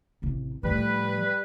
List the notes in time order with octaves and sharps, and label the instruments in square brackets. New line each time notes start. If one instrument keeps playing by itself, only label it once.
[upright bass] A1 C3
[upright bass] A2 F3 [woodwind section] G3 B4